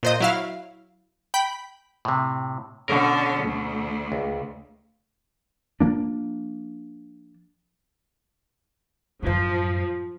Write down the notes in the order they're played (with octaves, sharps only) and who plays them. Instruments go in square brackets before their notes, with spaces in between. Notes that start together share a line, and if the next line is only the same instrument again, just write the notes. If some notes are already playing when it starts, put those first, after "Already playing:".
[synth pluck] A#2 C5 D#5
F#3 E4 F5
G5 B5
[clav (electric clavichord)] A2 C3
[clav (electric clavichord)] B2 A#4 [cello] D3 C#4
[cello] D2
[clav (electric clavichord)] C#2
[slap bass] F3 A#3 D4
[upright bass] F#2 A2 [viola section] F3